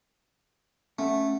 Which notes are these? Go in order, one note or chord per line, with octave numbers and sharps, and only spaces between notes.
A3 C#4 F#5